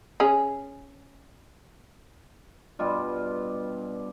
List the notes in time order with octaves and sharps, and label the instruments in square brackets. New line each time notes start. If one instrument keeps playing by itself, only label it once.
[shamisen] C#4 G#4
[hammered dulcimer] G2 B2 G3 F4